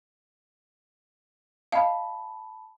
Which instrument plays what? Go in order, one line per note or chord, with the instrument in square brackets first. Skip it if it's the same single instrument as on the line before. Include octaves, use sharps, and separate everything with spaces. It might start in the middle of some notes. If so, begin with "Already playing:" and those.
[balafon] D#5 F5 [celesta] A5 B5